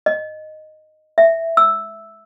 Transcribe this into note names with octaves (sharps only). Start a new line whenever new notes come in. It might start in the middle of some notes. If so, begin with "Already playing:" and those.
D#5
E5
E6